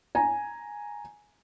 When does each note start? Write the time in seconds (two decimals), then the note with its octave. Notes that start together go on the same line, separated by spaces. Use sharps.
0.15 G#5 A#5